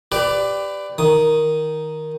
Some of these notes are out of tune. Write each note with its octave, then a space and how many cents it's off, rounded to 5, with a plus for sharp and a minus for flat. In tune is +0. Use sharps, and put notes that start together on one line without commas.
G4 +5 B4 +25 D5 +0
D#3 +0 D#6 +0